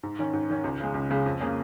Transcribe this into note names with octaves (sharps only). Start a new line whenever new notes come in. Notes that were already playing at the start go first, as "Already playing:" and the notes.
G#2
D#3 C#4
G#2
D#3 C#4
C#2
C#3 G#3
C#2
C#3 G#3
F2
C#3 A#3 C#4 G#4